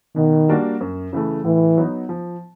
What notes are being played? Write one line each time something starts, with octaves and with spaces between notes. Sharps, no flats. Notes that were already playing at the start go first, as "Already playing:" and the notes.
B2 D#3
G3 A#3 D4 F#4
F#2
C#3 E3 A3
A2 E3
F#3 B3 D#4
F3